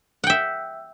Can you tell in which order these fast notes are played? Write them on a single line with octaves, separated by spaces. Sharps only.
F#5 G5 E5